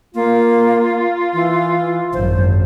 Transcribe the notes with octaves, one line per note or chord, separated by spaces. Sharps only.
A#3 F4
E3
G#1 F#2 C5